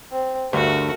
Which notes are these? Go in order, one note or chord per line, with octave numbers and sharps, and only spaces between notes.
C4
D2 G2 A3 F#4 A#4